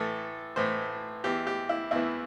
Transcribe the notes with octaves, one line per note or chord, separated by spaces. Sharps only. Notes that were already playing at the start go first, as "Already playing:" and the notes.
Already playing: A2 E3 A4
A2 E3 C5
E2 E3 G4
G4
E4
E2 E3 E4